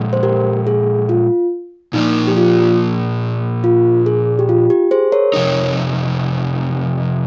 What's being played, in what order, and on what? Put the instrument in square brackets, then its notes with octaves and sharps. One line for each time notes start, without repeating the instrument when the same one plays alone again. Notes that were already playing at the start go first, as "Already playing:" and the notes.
Already playing: [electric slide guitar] A#2 F3 G#3
[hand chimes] C5
G4 A#4
G#4
F4
[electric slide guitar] A#2 F3 A#3 [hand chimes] D#4
[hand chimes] G4
F4
F4
G#4
G4
F4
G4
G#4 C5
A#4 C#5
[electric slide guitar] F2 C3 D#4